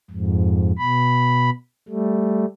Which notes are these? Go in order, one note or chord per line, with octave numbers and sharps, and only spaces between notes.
F2 G#2
B2 B5
G3 A3